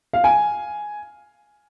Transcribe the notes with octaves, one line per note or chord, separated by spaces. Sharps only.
F5
G#5